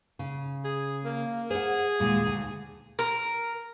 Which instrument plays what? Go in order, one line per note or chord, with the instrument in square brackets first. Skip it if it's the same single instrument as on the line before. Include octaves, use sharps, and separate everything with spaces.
[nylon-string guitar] C#3
[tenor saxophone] G#4
A#3
[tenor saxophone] G#4 [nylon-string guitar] C5 F#5
[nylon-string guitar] D#2 A#2 G#3
D2
[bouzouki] A#4